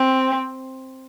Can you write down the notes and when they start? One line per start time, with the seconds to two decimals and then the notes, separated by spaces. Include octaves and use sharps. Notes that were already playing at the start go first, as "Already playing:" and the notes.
Already playing: C4